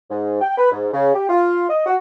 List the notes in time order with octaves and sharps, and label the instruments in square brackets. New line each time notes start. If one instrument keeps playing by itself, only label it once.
[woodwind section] G#2
G5
B4
G#2
C#3
G4
F4
D#5
F#4